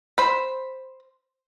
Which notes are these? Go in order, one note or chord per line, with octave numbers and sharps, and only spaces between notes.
C5 B5